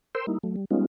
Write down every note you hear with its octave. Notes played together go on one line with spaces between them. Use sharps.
A#4 C5 G5 C6 E6
G3 A#3 D#4 E4
F#3 A3
G3
G3 G#3 B3 C#4 D#4 F4